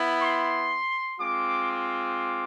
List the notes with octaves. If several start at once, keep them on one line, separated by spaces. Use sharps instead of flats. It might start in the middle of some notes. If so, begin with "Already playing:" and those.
Already playing: B3 E4
C6
G#3 C4 F4 D6
D6